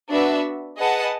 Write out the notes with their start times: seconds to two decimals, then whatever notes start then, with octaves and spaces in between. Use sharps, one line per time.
0.10 B3 D4 F#4 B4 E5
0.78 G#4 B4 D#5 F#5 A5